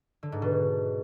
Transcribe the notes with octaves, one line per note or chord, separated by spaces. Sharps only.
D3
G#2
B2